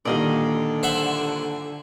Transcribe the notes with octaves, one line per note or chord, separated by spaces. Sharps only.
A#2 D3 D#3 G3 D5 D#5 F5
C5 E5 F#5